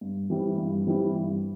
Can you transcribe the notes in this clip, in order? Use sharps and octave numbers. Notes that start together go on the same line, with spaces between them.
G2
E3 G3 C4 E4
G2
E3 G3 C4 E4
G2